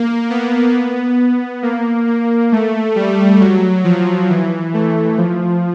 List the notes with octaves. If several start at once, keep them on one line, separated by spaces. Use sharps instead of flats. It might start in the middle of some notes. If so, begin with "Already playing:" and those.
Already playing: A#3
B3
A#3
A#3
A3
G3
F#3
F3
E3
A3
F3